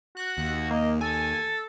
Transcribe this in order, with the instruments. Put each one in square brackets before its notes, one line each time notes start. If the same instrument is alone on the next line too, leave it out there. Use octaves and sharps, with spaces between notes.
[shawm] F#4 [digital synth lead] F#6
[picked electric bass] D#2
[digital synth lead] A#3 [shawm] D#5
[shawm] A4 [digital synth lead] G#5